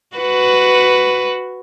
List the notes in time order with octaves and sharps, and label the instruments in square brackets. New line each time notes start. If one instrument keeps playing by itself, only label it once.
[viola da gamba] F#4 B4